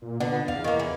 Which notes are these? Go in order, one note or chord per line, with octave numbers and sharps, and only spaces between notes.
A#2
D3 B3
E2 F5
E2 D#3 A#3
E3